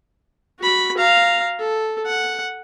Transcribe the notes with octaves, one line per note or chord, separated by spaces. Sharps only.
F#4 B5
F5 A#5
A4
F#5